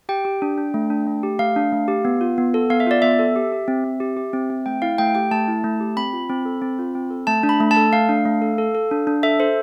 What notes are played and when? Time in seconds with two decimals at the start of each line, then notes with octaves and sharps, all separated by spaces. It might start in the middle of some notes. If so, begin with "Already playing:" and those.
0.09 G4 G5
0.25 G4
0.42 D4
0.58 D4
0.74 A3
0.90 D4
1.07 A3
1.23 G4
1.39 A3 F5
1.56 D4
1.72 A3
1.88 G4
2.05 B3
2.21 F4
2.38 B3
2.54 A4
2.70 B3 F5
2.80 E5
2.87 F4 D5
3.02 B3 E5
3.19 A4
3.36 G4
3.52 G4
3.68 C4
3.84 C4
4.00 G4
4.16 G4
4.33 C4
4.50 C4
4.66 A3 G5
4.82 E4 F5
4.98 A3 G5
5.15 G4 G5
5.31 A3 A5
5.48 E4
5.64 A3
5.80 G4
5.97 C4 B5
6.13 F4
6.29 C4
6.45 A4
6.62 C4
6.79 F4
6.95 C4
7.10 A4
7.27 A3 A5
7.43 D4
7.49 B5
7.60 A3
7.71 A5
7.77 A4
7.93 A3 F5
8.09 D4
8.26 A3
8.42 A4
8.58 A4
8.75 A4
8.91 D4
9.07 D4
9.23 A4 E5
9.40 A4 C5